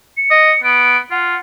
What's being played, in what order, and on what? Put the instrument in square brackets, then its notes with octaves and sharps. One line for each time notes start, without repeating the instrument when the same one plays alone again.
[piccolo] C#7
[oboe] D#5
[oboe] B3 [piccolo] D7
[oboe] F4 [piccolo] F#5